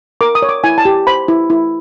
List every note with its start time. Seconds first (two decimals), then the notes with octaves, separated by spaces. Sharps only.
0.21 A#4 D6
0.35 D#6
0.42 C#5
0.49 D6
0.64 E4 G#5
0.78 A5
0.85 G4
1.07 C5 B5
1.28 E4
1.50 E4